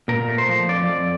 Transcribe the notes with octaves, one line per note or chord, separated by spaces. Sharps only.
A#2 A#4
A3
C5
F3
F2 D5
F2